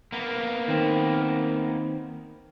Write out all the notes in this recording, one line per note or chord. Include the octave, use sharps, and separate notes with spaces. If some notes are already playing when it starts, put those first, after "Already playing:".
A#3 B3
D#3 C4